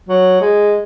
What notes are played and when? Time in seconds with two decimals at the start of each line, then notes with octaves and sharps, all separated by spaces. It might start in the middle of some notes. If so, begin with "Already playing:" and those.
0.09 F#3
0.41 G#3